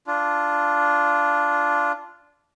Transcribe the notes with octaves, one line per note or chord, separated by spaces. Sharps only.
D4 F4